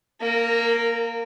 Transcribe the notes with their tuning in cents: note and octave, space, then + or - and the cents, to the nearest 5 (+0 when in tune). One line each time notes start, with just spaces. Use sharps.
A#3 +0 A#4 -25